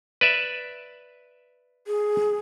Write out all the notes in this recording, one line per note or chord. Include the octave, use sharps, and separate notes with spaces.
B4 D5 E5
G#4